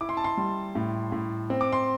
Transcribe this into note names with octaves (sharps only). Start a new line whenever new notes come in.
E4 D6
C6
A5
C6
G3
A2
A2
C4
D6
C6